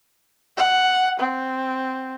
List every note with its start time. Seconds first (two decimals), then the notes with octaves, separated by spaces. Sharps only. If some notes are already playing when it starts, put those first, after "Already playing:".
0.57 F#5
1.20 C4